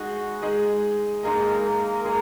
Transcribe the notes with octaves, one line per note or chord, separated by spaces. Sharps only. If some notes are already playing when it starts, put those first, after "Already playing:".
Already playing: G#3 D#4 F#4 G#4
G#3 D#4 G#4 D#5
G#3 A#3 D#4 G#4 A#4 D#5
A#3 A#4
G#3 A#3 D#4 G#4 A#4